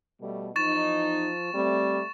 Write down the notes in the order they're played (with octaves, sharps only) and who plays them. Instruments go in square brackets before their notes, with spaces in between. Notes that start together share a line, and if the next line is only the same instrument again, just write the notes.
[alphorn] B2 [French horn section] G3 A3
[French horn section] E2 D#4 [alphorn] F3 [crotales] C#6 A6 E7
[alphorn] G3 [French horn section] A3 C4